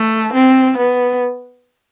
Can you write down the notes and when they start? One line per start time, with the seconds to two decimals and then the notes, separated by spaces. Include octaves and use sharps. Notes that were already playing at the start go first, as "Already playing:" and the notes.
Already playing: A3
0.33 C4
0.78 B3